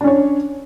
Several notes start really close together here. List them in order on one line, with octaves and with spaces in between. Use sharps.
D4 C#4 C#5